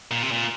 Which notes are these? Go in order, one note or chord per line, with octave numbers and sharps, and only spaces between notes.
A#2
C3
A#2